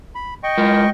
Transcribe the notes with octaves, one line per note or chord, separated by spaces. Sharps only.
B5
D#5 G5 C#6
G#3 F4 A#4